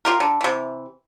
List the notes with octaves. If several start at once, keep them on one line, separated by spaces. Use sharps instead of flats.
F4 G4 A#4
D3
C3 E3